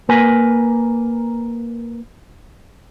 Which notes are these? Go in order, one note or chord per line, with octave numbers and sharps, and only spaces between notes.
A#3 A#4 B4 G#5